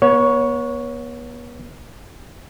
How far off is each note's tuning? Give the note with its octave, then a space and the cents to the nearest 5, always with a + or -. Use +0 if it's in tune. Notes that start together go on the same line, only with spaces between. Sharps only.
B3 -35 C#5 +5